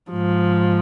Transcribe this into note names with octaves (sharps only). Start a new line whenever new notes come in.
G#2 F3